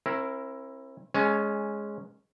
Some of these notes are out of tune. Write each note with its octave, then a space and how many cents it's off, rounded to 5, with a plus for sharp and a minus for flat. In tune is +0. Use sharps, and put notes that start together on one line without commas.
C4 +40 E4 +10 A#4 +0
G#3 +0 C#4 -5 G#5 +45